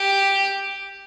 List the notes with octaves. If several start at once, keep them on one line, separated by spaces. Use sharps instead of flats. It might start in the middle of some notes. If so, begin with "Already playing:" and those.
Already playing: G4